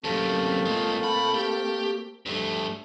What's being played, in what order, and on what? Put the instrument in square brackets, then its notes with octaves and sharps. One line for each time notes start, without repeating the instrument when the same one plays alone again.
[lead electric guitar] F#2 C3 [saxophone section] A3 A#3 C4
[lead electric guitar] G#3 F4
A#2 B5
G4
G2 A3